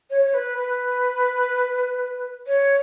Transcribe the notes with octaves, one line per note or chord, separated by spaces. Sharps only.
C#5
C#5
B4
B4
C#5